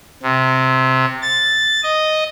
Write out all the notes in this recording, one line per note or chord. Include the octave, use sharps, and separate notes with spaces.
C3
A6
D#5